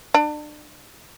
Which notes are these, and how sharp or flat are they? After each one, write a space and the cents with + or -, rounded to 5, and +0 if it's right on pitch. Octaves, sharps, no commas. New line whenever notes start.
D4 +35